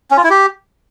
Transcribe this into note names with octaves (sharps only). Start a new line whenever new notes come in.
C#4
F4
E4
G4